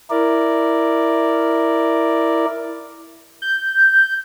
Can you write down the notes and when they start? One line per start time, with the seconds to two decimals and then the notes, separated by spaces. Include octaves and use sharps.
0.10 E4 A#4 D5
3.42 G6